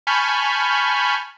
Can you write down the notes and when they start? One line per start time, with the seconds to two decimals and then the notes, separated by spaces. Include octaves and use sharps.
0.07 G#5 A5 B5 C#6 F6 G6